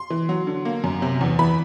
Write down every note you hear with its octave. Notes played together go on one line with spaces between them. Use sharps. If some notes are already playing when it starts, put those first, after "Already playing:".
Already playing: C6
E3
F#3
D3
A#3
F#2
C3
E2
E3 B5